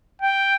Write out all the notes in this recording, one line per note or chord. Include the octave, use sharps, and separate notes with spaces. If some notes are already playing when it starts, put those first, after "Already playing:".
G5